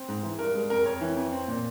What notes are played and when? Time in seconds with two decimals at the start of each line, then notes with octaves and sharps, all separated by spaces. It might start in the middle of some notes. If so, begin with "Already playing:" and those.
Already playing: C4
0.08 G#2
0.23 E3
0.39 G2 A#4
0.55 G#3
0.70 F2 A#4
0.85 F2 C#5
1.01 E3
1.17 F2
1.32 C4
1.48 A#2